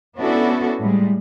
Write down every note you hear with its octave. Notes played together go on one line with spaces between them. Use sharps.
B3 C#4 D4 E4 F#4 A4
A2 G3 G#3